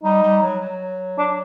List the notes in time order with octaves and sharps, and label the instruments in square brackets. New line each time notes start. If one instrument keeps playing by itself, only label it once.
[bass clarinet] G3 [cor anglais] D#4
[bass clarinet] G3
F#3
F#3
[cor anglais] D4